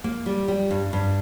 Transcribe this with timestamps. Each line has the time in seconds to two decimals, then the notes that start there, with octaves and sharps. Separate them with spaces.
0.04 A#3
0.26 G3
0.48 G3
0.71 G2
0.93 G2